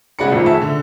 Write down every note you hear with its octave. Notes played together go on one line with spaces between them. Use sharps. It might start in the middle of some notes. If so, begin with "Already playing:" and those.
C#3 G#3 F#4 D5 B5 C#7
F2 A2 D#3 F3
G#4 E5 A5
D3